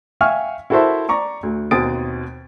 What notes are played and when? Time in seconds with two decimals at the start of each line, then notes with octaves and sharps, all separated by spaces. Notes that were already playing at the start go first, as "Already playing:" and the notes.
0.21 E5 F5 G5 G#5 C#6 F6
0.70 E4 F#4 A4 A#4 C5 E5
1.09 D5 A#5 C#6 D6
1.43 D2
1.71 D#2 B2 C4 D#6 A6 D7